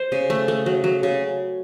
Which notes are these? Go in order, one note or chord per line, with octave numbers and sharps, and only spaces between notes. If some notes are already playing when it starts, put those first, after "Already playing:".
Already playing: C5
C#3
A3
A3
F#3
F#3
C#3